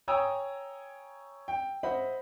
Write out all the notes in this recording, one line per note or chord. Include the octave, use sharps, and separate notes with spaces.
C#5 G5 G#5 A#5 D#6 E6
G5
C5 D#5 E5 F#5 B5